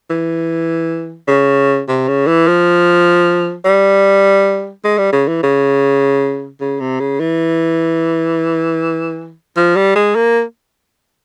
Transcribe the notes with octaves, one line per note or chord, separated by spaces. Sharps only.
E3
C#3
C3
C#3
E3
F3
G3
G#3
G3
C#3
E3
C#3
C#3
C3
C#3
E3
F3
G3
G#3
A#3